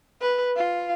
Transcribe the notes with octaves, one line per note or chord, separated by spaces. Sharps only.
B4
F4